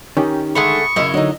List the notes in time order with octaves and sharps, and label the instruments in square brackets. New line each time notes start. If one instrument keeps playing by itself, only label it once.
[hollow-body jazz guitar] D#3 [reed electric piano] C#4 D#4 G4
[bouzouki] D3 G#3 A3 [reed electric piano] B5 D#6 [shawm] C#6
[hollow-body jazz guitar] F#2 C#3 [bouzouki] E4 A#4 D#5
[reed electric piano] D3 F#3 C#5 [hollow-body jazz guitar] D4 D#4